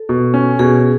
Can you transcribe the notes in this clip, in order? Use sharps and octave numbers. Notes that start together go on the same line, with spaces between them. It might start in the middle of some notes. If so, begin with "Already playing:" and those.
Already playing: A4
B2
C#4
B2 G#4